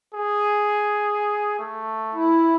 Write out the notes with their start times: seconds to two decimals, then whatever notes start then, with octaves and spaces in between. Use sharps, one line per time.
0.14 G#4
1.59 A3
2.14 E4